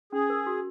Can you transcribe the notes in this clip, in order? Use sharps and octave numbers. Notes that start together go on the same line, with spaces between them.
C#4 G#4
A#4
F#4